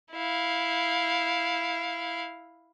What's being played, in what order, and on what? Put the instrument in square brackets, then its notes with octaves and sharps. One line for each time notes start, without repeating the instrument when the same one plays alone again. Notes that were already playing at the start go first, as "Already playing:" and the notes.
[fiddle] E4 F5